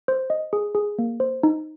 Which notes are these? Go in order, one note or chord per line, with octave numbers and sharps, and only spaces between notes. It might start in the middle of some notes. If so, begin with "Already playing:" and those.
C5
D#5
G#4
G#4
A#3
C5
D#4